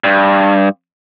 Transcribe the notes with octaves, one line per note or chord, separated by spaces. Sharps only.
G2